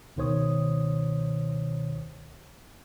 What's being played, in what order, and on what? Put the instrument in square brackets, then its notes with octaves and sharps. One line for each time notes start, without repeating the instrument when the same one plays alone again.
[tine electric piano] C#2 B2 D#3 C5 C#5 D#6